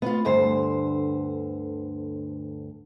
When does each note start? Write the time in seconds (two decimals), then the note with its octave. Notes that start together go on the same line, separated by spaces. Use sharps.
0.02 B3 F4
0.25 D2 G2 D3 C5